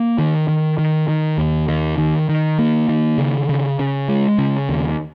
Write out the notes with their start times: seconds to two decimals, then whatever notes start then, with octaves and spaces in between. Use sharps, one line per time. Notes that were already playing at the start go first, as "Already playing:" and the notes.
Already playing: A#3
0.18 D#3
0.48 D#3
0.78 D#3
1.08 D#3
1.38 D#2
1.68 D#3
1.98 D#3
2.29 D#3
2.59 A#3
2.89 D#3
3.18 C#3
3.49 C#3
3.79 C#3
4.08 G#3
4.38 C#3
4.69 D#2